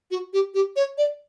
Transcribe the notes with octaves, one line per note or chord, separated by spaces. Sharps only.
F#4
G4
G4
C#5
D5